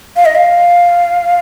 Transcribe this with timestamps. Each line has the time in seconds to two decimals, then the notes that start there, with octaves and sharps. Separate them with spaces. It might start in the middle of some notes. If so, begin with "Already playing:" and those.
0.16 F5
0.26 D#5
0.35 F5